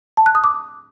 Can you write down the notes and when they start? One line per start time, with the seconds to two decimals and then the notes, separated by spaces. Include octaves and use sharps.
0.17 A5
0.26 F#6
0.35 D#6
0.44 D6